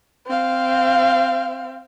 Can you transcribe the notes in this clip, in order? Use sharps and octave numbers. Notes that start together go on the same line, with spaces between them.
C4 F5